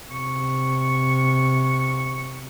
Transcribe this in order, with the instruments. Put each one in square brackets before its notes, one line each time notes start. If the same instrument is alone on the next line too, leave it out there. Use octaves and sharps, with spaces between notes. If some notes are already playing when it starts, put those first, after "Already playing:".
[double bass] C3 [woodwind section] C#6